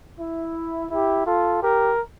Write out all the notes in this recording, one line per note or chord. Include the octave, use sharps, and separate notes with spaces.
E4
E4 G4
F4 A4
G4 A#4